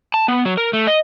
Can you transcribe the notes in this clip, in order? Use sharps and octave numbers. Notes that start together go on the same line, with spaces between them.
A5
B3
F#3
A#4
A3
D#5